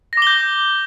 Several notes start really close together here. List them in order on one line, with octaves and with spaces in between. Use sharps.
A#6 D6 G7 G6